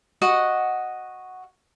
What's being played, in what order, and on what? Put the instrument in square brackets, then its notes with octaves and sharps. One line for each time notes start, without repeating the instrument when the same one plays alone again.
[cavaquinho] F#4 D#5 F#5